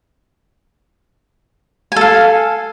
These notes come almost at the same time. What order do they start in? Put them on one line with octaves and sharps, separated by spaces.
G#5 A4 F5